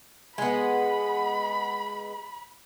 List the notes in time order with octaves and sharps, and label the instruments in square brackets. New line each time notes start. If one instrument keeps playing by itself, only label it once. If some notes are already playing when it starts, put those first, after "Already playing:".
[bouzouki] G#3 B3 [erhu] B5